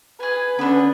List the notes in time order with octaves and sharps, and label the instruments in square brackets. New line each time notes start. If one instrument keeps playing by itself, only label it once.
[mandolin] G#4 G#5 [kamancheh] B4
[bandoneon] D3 B3 [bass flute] C#4 [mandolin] D4 B5